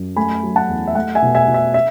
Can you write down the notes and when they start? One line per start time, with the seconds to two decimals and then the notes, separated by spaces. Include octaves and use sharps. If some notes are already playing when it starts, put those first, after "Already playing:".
Already playing: F#2
0.16 A3 G#5 B5
0.43 F#3
0.56 F#5 A5
0.69 E2
0.87 E5
0.95 A3 F#5
1.15 E5 G#5
1.22 B2
1.35 E5 G#5
1.48 B2
1.54 E5
1.74 E5